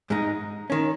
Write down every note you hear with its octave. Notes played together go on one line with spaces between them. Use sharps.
G#2 G#3 D#4
D#3 C#4